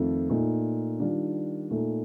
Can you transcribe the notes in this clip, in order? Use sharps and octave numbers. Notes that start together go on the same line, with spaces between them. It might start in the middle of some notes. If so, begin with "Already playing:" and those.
Already playing: F2 D#3 A3 C4 F4
A#2 A3 D#4
D#3 G3 D4 F4
A#2 A3 D#4